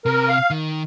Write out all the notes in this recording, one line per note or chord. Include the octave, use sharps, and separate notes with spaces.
C3 A#4
F5
D#3